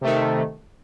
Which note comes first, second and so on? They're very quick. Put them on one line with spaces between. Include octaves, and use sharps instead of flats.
C3 A3 D#3